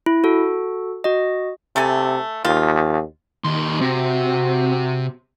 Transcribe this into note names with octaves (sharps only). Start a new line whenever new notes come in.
E4
F#4 A4
F#4 D#5
C3 A3 A4 G#5
D#2 D#3 F4
D#2 D#3 C6
C3 C4 F#4